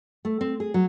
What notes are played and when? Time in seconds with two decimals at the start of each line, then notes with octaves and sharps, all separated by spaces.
0.25 A3
0.41 C4
0.60 G#4
0.74 F#3